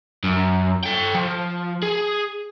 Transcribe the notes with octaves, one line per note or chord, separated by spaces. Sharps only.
F#2
A4 G5
F3
G#4